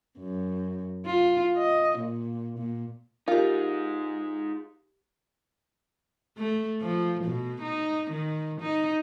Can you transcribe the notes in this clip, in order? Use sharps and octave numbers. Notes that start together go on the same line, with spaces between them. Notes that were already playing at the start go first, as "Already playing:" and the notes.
F#2
F4
D#5
A#2
A#2
D#4 F4 G4 G#4 A#4
A3
F3
B2
D#4
D#3
D#4